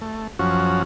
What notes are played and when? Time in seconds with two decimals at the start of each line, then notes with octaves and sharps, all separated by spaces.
0.01 A3
0.39 F#2 F3 C#4 F#4